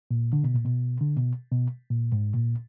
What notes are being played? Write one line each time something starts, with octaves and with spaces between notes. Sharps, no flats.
A#2
D3
B2
A#2
B2
D3
B2
B2
A#2
G#2
A#2